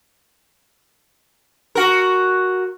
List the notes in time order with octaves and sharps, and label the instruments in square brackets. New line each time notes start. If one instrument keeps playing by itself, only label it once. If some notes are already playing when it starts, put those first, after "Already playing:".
[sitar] F#4 A#4